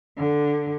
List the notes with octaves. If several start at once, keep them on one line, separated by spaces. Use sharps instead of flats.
D3